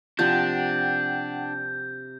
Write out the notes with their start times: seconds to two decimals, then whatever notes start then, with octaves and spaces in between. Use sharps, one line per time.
0.19 C3 F3 D4 F#5 G5 G6